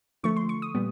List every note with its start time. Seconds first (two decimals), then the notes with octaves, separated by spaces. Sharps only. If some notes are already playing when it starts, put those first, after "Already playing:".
0.23 D3 F3 A3 C#6
0.37 C6
0.49 C#6
0.62 D#6
0.75 A#2 G3 B3